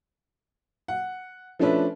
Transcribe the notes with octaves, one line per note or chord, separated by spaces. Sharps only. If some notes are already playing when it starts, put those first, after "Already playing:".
F#5
F3 A3 C#4 D4 B4 E5